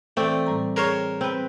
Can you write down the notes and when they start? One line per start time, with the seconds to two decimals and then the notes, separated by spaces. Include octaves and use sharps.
0.17 E3 A3 C4 D5
0.47 A2 G3 A#5
0.76 G#4 A#4 C5 C#5
1.21 C4 B4